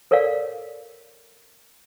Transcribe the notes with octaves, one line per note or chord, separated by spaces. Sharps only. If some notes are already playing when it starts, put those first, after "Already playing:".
A4 A#4 C#5 D5 F5